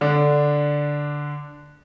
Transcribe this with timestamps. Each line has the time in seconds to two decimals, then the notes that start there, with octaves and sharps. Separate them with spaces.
0.01 D3 D4